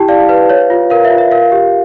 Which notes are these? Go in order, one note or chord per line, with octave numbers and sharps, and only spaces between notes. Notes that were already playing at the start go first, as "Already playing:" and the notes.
Already playing: E4 G4 G5 A5
D5 F5
B4
C#5
F4
A#4 F5
E5
F4
E5
A#4 F5
G4